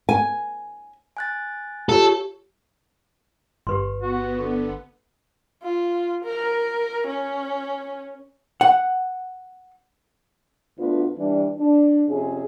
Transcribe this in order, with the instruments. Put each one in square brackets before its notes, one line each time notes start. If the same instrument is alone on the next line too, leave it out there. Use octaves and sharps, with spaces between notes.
[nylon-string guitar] G#5
[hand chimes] G#5 F#6 A6
[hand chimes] F4 G4 C#5 [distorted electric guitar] A4
[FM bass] G1 [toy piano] G4 B4 C6
[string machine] B3 [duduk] F#4
[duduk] D3
[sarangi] F4
A#4
C#4
[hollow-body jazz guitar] F#5
[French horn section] D2 B3 D4 F4 B4
E3 G3 D4
D4
F2 C3 C#4 G#4